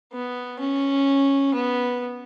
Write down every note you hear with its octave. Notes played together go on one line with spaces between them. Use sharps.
B3
C#4
B3